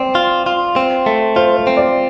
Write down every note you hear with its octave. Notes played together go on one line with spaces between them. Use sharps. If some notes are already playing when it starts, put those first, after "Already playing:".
Already playing: C4 D5
F4
F4
C4
A3
F4 C5
C5
C4
D5